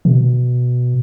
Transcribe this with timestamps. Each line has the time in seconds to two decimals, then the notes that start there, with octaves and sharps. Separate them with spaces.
0.05 B2